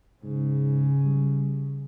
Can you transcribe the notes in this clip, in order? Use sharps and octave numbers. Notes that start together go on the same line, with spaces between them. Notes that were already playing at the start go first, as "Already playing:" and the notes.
G#2 C#3
G3